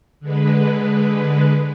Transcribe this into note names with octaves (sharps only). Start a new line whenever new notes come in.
D3 G#3 B4